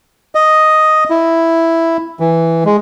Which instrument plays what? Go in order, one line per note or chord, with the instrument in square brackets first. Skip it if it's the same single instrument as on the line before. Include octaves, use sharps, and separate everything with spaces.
[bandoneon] D#5
E4
E3
G#3